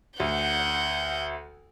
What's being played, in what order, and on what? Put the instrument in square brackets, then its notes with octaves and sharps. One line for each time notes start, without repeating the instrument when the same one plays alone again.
[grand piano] D2 [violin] F#5 G6